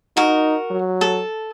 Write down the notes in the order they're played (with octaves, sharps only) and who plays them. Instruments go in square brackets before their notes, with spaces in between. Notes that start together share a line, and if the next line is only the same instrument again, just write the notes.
[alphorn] D#4 [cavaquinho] F#4 A#4
[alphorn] F#3
[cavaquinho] A4